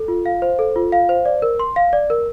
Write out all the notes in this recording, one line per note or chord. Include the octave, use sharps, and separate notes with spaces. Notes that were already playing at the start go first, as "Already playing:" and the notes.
Already playing: A4
F4
F5
C5
A4
F4
F5
C5
D5
A#4
C6
F5
D5
A#4